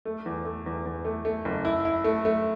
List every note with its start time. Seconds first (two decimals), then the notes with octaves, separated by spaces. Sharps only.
0.05 A3
0.26 E2
0.45 A3
0.66 E2
0.86 E2
1.05 A3
1.25 A3
1.45 F#1
1.65 E4
1.85 E4
2.04 A3
2.25 A3